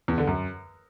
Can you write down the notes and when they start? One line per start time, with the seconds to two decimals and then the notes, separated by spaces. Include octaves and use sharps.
0.08 E2
0.18 D3
0.27 F#2